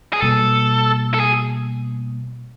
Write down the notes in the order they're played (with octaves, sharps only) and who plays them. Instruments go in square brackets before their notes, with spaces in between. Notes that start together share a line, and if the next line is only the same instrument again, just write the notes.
[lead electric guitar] G#4
[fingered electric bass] B2 G3 A#3 [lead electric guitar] A4
[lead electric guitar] A4
G#4